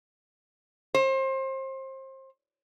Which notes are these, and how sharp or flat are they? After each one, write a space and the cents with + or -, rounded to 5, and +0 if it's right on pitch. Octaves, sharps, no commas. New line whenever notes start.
C5 +30